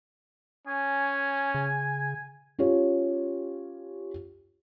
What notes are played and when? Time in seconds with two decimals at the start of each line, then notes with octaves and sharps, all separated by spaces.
0.67 C#4 G#5
1.54 C#3
2.59 C#4 F4 G4 C#5